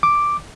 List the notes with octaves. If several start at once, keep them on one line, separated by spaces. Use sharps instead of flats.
D6